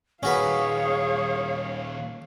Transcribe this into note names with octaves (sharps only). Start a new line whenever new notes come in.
A#2 D#3 C#4 F#4 G#4 B4 C#5 F5